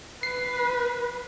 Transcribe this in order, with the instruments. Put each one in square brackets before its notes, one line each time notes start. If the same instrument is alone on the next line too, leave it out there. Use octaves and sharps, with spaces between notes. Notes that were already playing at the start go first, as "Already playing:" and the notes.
[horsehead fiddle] B4 [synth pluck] C7